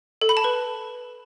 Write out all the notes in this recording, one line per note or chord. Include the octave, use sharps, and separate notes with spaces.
A4
B5
A5
B4